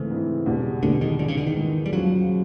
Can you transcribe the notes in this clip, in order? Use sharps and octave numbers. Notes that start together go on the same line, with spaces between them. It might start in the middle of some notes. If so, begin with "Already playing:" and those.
Already playing: G#2 C#3 E3 A3 C4 E4
G#2 E3 A3 C4 E4
E2 B2 G3
E2 B2 D3 G3
D#3
G#2 D3 E3 G#3
C#3
D3
D#3
G#2 E3 G#3
G3
D#2 C#3 F3 F#3